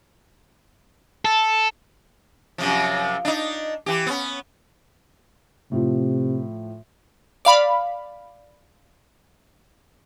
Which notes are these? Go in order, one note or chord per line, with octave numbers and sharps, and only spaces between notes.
A4
F#2 C3 F3
D4 D#4
E3 G4
B3 C#4
A2 C3 F3
D5 F5 B5